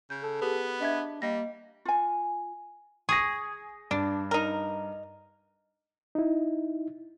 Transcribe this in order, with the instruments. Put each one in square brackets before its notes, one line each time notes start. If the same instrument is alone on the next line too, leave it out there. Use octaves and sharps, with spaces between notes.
[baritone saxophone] C#3 [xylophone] G6
[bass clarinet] A4
[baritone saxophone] B3 [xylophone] G4 G#4 B4
[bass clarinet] D4 [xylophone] D#5 E5 G#6
[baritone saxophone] G3 [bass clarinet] A#3 [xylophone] D#5 A#6
[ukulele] F4 G#5
[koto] G#4 [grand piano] C#6 A#6
[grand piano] G2 [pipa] D4
[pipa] D#4 A#4
[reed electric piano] D#4 E4